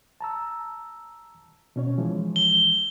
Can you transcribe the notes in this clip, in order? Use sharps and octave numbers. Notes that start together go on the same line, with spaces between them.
A5 A#5 E6
B2 C#4 C#5
E3 F3 G#3
G7